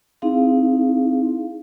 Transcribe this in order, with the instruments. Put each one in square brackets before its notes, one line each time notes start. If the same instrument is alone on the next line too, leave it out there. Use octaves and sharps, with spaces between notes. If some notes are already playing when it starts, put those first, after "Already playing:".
[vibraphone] C4 D#4 E4 G#4 F5